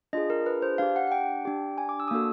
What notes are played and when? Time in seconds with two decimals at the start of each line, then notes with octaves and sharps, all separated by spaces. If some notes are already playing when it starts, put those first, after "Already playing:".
0.13 D4 F4 G#4 D#5
0.30 A#4
0.46 B4
0.62 C5
0.78 D4 G4 F5
0.96 F#5
1.07 F#5
1.12 G5
1.45 D4 G4
1.78 G#5
1.89 D6
2.00 E6
2.08 D#6
2.11 A#3 D4 F#4 A4 E6